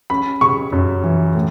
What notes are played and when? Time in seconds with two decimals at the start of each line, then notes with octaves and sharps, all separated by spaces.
0.10 C#4 B5
0.41 C#3 C#6
0.72 F#2
1.04 E3
1.35 A2